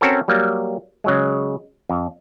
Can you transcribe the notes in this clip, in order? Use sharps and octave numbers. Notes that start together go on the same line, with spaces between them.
C4 C#4 F#4 A4 A#4
F#3 G3 A#3
C#3 F#3 G#3
F2